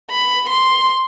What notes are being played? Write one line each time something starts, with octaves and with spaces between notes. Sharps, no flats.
B5
C6